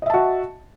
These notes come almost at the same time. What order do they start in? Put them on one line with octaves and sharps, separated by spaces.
D#5 E5 A5 F#4